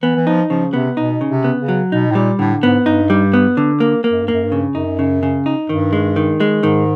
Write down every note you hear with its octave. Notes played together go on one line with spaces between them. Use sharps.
E3 B3
E3
F3 D#4
C#3 F3
C3 B3
B2 D#4
C#3
C3
B3
C#3
F#3
B2 D#4
A2
A#2 G3
A2 D3
G#2 B3
G2 D#4
G3
B3
D3
A#3
A#3
F#2
G2
F#2 A#3
G2
C#3
F#2 D#4
C#3
C#3
D#4
G2 D#3
G#3
D#3
G#3
G#2 D#3